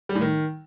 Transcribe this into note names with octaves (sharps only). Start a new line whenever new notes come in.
G3
A2
D#3